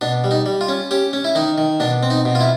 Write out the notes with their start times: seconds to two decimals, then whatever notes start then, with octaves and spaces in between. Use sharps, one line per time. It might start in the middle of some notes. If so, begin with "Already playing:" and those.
0.01 B2 D4
0.24 G3
0.31 D#4
0.46 G3
0.61 F4
0.68 C#4
0.91 C#4 G4
1.13 C#4
1.24 E4
1.35 D#3 D#4
1.58 D#3
1.80 B2 D4
2.03 C4
2.10 D#4
2.25 B2
2.35 F4
2.40 E4